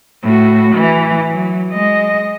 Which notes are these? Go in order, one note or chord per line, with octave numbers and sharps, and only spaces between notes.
A2 F#4
E3
F#3
G#3 D#5